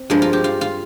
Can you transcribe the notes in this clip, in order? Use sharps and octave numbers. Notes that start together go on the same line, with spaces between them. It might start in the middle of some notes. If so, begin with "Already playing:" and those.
Already playing: C4
G2 F3 G#3 A#4
F4
G4
F4
F4